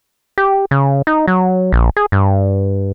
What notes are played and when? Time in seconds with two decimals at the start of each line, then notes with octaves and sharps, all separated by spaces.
0.38 G4
0.71 C#3
1.07 D#4
1.28 F#3
1.73 A#1
1.97 G#4
2.12 G2